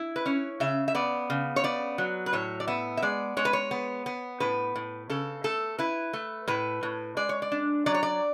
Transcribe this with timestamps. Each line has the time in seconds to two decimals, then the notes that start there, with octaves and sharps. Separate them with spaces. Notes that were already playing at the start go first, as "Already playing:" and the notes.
Already playing: E4
0.16 B4
0.26 C#4 C#5
0.60 C#3 E5
0.88 E5
0.95 B3 D5
1.30 C#3
1.56 C#5
1.64 B3 D5
1.98 F#3
2.26 B4
2.33 A2 C#5
2.60 D5
2.68 B3 E5
2.97 E5
3.02 G#3 D5
3.37 G#3 C#5
3.45 B4
3.53 C#5
3.71 B3
4.06 B3
4.40 A2 B4
4.76 A2
5.10 C#3 A4
5.44 A3 A4
5.79 E4 B4
6.13 A3
6.48 A2 B4
6.83 A2
7.17 G#3 D5
7.29 C#5
7.42 D5
7.52 D4
7.86 F#3 D5
7.94 C#5
8.03 D5